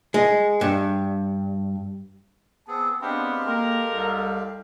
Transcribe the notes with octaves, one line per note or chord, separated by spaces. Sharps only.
G#3
G2
B3 C4 G#4 A5
G#3 B3 C4 D4 G4 F5
A#3 A4 A#4
C2